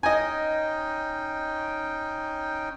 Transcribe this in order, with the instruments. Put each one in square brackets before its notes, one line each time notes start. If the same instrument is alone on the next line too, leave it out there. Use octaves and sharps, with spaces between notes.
[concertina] C#4 D#4 G5 [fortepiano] D#5 G#5